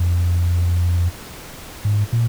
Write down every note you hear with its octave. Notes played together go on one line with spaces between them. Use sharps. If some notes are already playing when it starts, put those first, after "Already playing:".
Already playing: F2
G#2
A#2